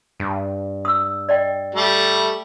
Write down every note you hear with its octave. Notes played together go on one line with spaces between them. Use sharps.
G2
D#6 E6
D5 D#5 G5
G3 A3